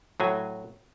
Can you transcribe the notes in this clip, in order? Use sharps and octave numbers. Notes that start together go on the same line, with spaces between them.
A2 F#3 G#5